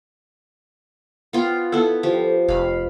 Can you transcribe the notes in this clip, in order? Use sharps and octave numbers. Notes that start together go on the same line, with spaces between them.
B3 F4 G5
B3 E4 A4
F3 G4
F1 F5 B5